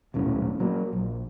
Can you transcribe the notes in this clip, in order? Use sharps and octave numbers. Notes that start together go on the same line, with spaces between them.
D#1 B1 A2 C#4
F#3 A#3
A#1